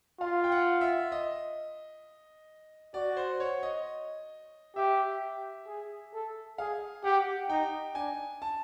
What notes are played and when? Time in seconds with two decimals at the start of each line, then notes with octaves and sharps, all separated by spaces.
0.20 F4 F5
0.44 G5
0.52 F#5
0.81 E5
1.12 D#5
2.94 F#4 D5
3.17 C5
3.40 C#5
3.63 D#5
4.76 G4 E5
5.68 G#4
6.14 A4
6.58 G#4 F5
7.04 G4 F#5
7.50 D#4 G5
7.95 D4 G#5
8.42 A5